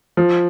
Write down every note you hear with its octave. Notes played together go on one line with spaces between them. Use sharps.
F3